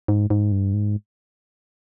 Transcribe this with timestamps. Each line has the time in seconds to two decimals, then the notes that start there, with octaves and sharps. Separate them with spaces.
0.08 G#2
0.30 G#2
0.52 G2
0.74 G#2